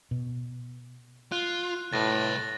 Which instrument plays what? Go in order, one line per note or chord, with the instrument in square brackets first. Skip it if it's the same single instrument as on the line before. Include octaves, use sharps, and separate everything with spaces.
[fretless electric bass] B2
[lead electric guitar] F4 [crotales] F#6
[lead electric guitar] C2 B4 [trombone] A2 [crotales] A6 A#6